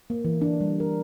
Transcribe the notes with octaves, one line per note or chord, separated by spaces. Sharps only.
A#3
E3
D4
G3
A#4